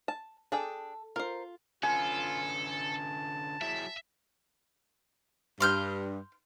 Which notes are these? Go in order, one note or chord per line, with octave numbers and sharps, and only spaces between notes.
A5
D4 G#4 A4 G5
F4 A#4 C5
D3 C#4 F4 A4 B4 G#5
A5
F#3 E4 G#4 E5
G2 C6 F6 G6